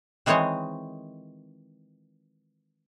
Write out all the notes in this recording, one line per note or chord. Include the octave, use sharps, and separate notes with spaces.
D#3 E3 G#3 C4 C#5 D#5